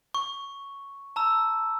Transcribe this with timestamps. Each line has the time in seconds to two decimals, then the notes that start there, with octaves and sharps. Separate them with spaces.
0.14 C#6
1.16 A5 A#5 E6